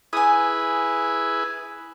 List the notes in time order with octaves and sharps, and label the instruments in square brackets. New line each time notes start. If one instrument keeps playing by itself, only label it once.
[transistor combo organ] E4 G#4 B4 [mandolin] G#5 D#6